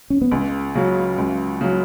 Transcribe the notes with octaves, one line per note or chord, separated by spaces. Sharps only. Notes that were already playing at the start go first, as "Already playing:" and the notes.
C#4
B3
C#2 G#3
C#3 F#3
C#2
C#3 F#3